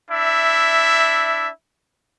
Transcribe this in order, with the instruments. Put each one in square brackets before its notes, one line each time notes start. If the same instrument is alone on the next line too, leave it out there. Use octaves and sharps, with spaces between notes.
[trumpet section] D4 E4 E5